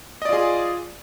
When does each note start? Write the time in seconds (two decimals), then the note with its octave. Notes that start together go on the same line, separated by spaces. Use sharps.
0.22 D#5
0.25 D5
0.29 F4
0.33 G#4